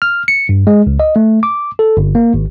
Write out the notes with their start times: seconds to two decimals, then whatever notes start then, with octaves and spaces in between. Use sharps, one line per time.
0.02 F6
0.28 C#7
0.49 G2
0.67 G#3
0.87 C#2
1.00 D#5
1.16 A3
1.43 D6
1.79 A4
1.97 G1
2.15 A#3
2.34 G#1